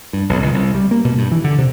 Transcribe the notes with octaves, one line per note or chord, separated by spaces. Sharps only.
G2
B1
C#2
C2
G3
A#3
B2
G2
E3
D3
C3